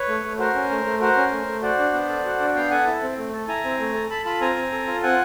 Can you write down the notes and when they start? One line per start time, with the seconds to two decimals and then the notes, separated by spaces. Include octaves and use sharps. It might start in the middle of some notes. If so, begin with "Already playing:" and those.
Already playing: B4 C#5
0.08 A3
0.24 A3
0.39 F#4 A#4 C5
0.55 C#4
0.70 A3
0.86 A3
1.01 F#4 A#4 C5
1.16 C#4
1.31 A3
1.47 A3
1.62 F#4 C5 D5
1.79 D4
1.93 B3
2.09 A4
2.25 F#4
2.40 D4
2.55 B3 F5 G5
2.70 A4 F#5 G#5
2.87 E4
3.02 C4
3.18 A3
3.33 A4
3.48 E4 G#5 A#5
3.64 C4
3.79 A3
3.94 A4
4.10 A4 A5 B5
4.25 F4 A5 B5
4.41 C4 G#5 A#5
4.56 C4
4.72 A4
4.87 F4
5.03 C4 F#5 G#5